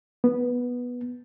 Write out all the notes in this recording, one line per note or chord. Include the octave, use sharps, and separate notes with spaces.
B3